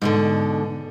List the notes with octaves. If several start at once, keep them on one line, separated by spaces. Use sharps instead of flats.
G#2 B2 D3